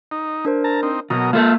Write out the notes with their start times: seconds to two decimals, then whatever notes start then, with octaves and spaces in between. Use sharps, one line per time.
0.11 D#4
0.45 D4 A#4 C5
0.64 A5 A#5
0.83 C4 D#4
1.10 B2 F#3 A#4 D#5 A#5
1.33 A#3 F4 A4 A5